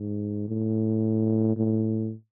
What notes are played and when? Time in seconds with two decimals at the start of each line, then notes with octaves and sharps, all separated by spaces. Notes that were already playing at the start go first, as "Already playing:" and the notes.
Already playing: G#2
0.48 A2
1.56 A2